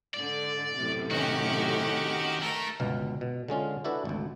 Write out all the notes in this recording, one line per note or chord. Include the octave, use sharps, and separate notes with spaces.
G#2 D3 D5
F#2 A2 C3
D#3 C#4 F#4 G4
A3 A#4
G1 C#2 B2 F5
B2
D3 G#3 C#4 F4
D4 E4 F#4 A4 B4
G#1 D2